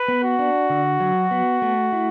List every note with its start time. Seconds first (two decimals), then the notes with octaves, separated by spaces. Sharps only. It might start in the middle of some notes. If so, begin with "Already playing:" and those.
Already playing: B4
0.08 B3
0.24 F#4
0.39 D4
0.70 D3
1.00 F#3
1.31 B3
1.62 A3
1.93 E4